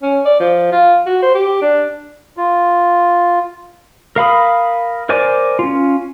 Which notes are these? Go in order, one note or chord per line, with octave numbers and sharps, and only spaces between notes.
C#4
D5
F3
F4
F#4
C5
G4
D4
F4
A#4 F5 B5 D#6
A#4 C5 D5 G#5 D6
C#4 F4